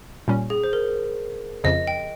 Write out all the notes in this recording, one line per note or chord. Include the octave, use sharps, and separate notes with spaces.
A#2 G3 C#4
G#4
C5
A#4
F2 C#3 F3 D#5
G5